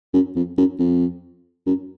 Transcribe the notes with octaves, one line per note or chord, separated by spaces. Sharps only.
F#2
F2
F#2
F2
F#2